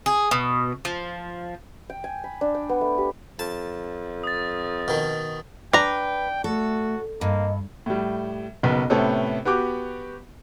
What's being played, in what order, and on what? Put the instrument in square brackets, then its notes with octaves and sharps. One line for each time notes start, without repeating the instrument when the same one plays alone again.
[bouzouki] G#4
B2
F3
[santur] G5
G#5
B5
D4
G5
B3
A3
G4
[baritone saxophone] F2 [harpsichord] A5
[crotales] D#6 A6
[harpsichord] B2 D#3
[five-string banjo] D4 A#5 [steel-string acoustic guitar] B4 [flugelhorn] G5
[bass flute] A3 [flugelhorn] F#4 [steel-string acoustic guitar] A4
[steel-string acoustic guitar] G2 [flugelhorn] A#3 [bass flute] D#5
[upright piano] A2 G3
F#1 B1 B3
A2 C3 B3 C#4 A4
B3 F#4 G4 D6